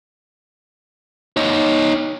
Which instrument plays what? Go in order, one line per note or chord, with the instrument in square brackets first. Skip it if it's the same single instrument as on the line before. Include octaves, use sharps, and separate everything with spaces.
[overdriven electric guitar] D#4 C#5